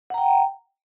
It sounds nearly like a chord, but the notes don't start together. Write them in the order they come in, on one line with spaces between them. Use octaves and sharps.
F#5 A#5 G5